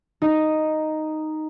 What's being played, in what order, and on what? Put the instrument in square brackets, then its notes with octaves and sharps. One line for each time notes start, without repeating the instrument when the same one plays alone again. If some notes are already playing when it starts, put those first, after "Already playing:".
[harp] D#4